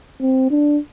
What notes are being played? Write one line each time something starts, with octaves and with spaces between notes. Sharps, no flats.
C4
D4